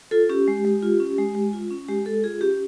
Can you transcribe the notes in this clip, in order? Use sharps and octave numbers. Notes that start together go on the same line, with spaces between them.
F4 A4
C#4 G4
G#3
G#3
F4
C#4
G#3
G#3
F4
C#4
G#3 G4
G#3 A4
F4 G#4
C#4 G4